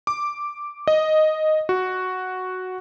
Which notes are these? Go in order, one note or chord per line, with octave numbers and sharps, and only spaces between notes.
D6
D#5
F#4